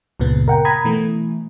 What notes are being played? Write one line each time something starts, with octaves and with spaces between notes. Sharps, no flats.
C#2 G2 A#2 C#3 B3
A#4 F#5 G5
A#5 B5 D#6 G#6
B2 E3 A3